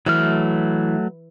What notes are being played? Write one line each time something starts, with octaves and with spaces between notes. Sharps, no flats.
E3 F#3 A3 F6